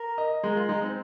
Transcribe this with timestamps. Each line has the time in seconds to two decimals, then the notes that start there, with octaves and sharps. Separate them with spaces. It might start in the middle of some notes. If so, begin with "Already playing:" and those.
Already playing: A#4
0.18 D#5
0.44 G#3 A#4
0.56 F4
0.68 G#3 D#4
0.82 C4